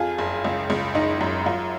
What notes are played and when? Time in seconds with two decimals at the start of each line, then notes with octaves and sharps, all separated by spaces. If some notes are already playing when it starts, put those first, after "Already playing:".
Already playing: F2 F4 G#4
0.18 F#1
0.44 C#2
0.70 C#2
0.95 F#1 D#4
1.21 F#2
1.46 F#2 F4